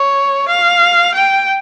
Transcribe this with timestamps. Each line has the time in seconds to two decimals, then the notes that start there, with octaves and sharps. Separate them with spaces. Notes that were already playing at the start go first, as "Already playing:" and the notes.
Already playing: C#5
0.48 F5
1.14 G5